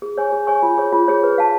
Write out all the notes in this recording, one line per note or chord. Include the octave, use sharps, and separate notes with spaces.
G#4
C#5 G#5 C#6
G#4
C#5 G#5 C#6
F4
G#4 C#5
F4
G#4 C#5
B4
F5 A5